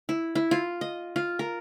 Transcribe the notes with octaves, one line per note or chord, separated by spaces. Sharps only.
E4
E4
F4
D#5
F4
A#4